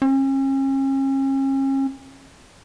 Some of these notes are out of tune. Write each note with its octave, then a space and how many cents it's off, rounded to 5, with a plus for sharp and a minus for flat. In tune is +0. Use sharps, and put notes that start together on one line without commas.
C#4 -40